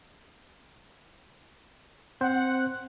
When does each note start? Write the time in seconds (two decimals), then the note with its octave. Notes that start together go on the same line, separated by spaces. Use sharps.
2.21 C4 C5 F#5